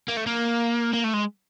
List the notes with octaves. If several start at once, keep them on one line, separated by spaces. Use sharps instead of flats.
A#3
A3
A#3
A#3
A3
G#3